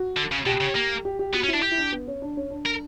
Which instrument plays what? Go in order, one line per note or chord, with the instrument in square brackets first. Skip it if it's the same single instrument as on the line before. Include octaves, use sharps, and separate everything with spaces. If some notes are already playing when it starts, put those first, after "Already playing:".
Already playing: [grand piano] F#4
[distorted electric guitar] D3
C#3
[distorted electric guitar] B2 [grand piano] G4
[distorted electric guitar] C#3
A#3
[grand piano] G4
G4
[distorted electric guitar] B3 [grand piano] F#4
[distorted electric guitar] C#4
[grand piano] E4
[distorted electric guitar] D4
G4
[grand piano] E4
D4
B3
C#4
D4
C#4
D4
[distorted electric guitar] A#4